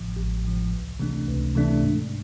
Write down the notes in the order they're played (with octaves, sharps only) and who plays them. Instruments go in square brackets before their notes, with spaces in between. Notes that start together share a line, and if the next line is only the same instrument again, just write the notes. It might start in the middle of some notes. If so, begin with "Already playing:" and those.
Already playing: [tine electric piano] A1 A2 F3
A1
A2 F3
C#2
C3 E3 A3 D4
C#2
C3 E3 A3 D4
G#2